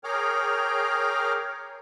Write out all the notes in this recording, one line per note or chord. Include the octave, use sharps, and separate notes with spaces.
G#4 A#4 C#5 G5 D6 F6